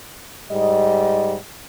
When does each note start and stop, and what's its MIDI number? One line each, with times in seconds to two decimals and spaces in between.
0.51 1.35 44
0.51 1.35 55
0.51 1.35 75